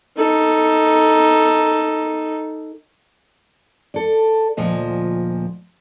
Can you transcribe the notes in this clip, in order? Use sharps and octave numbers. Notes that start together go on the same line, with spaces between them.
D#4 A4
A4 D5
D2 A#2 F3 D#5